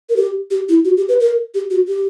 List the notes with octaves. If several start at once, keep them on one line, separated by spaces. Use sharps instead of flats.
A#4
G4
G4
E4
F#4
G4
B4
A#4
G4
F#4
G4